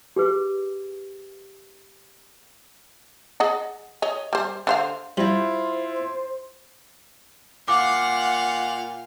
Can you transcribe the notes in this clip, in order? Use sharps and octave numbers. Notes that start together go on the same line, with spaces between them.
G4 G#4 B4
G#4 D#5 F#5
C#5 D#5
G3 C5
D3 C5 F5
G3 E4 F4 C5 A#5
A#2 F5 F#5 D6